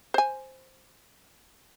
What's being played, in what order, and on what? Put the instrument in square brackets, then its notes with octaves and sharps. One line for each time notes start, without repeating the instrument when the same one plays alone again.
[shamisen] C5 G#5